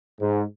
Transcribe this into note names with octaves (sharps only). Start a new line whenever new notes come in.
G#2